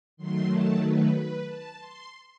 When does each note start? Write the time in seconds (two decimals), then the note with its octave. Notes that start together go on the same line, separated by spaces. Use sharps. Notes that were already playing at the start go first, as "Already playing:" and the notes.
0.17 D#3 F#3 A3 C6
0.49 A5
0.81 B4
1.14 B4
1.46 A5
1.77 C6